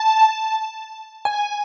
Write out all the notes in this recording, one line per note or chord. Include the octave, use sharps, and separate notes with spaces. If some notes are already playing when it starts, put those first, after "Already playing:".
Already playing: A5
G#5